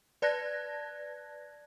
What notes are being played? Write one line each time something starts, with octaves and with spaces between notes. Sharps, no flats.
B4 D5 A5 F#6 G#6 A#6